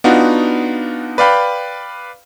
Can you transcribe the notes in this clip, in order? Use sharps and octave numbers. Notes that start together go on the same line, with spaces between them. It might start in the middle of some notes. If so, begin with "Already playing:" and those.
B3 D4 D#4 F4 F#4
B4 D5 F5 G5 B5